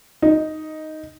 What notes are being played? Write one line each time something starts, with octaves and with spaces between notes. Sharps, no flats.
D#4